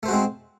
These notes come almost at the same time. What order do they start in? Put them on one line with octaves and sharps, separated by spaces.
A3 C5 F#4 G#3 C4